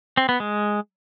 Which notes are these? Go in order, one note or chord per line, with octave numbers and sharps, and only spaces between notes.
C4
B3
G#3